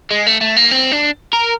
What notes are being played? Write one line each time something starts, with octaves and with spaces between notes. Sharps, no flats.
G#3
A3
A3
A#3
C4
D4
A#4